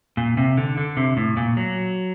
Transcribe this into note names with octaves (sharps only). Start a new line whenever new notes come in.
A#2
C3
D3
D3
C3
A2
A#2
F#3